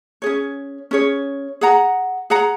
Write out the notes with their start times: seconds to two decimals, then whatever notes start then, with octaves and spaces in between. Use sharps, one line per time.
0.22 C#4 G#4 C#5
0.91 C#4 G#4 C#5
1.61 G#4 F#5 A#5
2.30 G#4 F#5 A#5